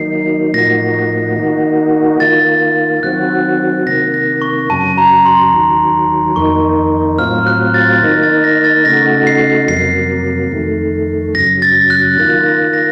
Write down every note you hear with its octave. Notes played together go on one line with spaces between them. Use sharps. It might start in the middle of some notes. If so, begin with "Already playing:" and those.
Already playing: D#3 F#3 A#3 D#4 C7
A2 F3 A#3 D#4 F#4 A#6
D#3 A#3 D#4 F#4
D#3 A#3 F4 A6
D#3 F#3 C4 F#4 F#6
C3 D#3 A#3 A#6
A#6
C#6
F#2 C#3 F#3 A5
A#5
C6
D#2 D#3 F#3
F2 D#3 A#3 D#4 C#6
A2 F#3 C4 F4 F6
F#6
A6
D#3 A#3 D#4 A#6
A6
A#6
A6
C#3 A3 D#4 F#4 A#6
C7
F2 C3 F#3 A#3 C7
F2 D#3 A3
F#2 C#3 F#3 A#6
A6
F#6
D#3 A#3 F4 A6
A#6
A#6